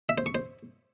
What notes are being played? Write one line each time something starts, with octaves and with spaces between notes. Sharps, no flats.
E5
C5
C#6
C5